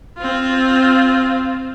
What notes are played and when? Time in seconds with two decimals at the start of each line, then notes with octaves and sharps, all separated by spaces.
0.18 C4 F4